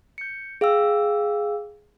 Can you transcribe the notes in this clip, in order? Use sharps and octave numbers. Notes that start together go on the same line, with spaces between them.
G6 C#7
G#4 F5 G5 E6